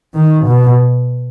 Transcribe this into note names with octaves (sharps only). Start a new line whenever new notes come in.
D#3
B2